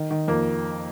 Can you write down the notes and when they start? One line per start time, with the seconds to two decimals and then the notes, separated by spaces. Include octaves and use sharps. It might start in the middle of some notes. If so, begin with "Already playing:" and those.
Already playing: D#3
0.11 D#3
0.28 F2 A#3